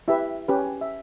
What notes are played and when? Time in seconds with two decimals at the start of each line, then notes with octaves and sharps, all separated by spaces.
0.08 E4 G4 B4 E5
0.48 C#4 G4 B4
0.81 E5